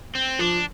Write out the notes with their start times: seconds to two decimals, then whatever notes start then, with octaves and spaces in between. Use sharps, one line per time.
0.15 C4
0.39 F3 D4